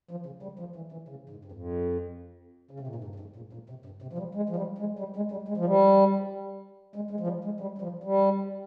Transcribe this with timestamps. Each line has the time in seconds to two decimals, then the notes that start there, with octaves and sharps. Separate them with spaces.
0.11 F3
0.26 C#3
0.43 G3
0.59 F3
0.76 E3
0.92 E3
1.08 C#3
1.29 G#2
1.45 G2
1.52 F2
2.71 C#3
2.80 C3
2.87 A#2
2.95 G#2
3.04 G2
3.15 G2
3.20 G#2
3.36 A#2
3.53 A#2
3.70 C3
3.85 G2
4.02 C3
4.13 F3
4.18 G3
4.35 G#3
4.49 F3
4.56 G3
4.78 G#3
4.99 G3
5.16 G#3
5.31 G3
5.48 G#3
5.57 F3
5.65 G3
6.96 G#3
7.11 G#3
7.20 F3
7.27 G3
7.44 G#3
7.60 G3
7.78 G3
7.81 F3
8.03 G3